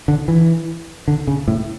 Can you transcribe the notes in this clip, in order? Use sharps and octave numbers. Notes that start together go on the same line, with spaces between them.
D3
E3
D3
C#3
A2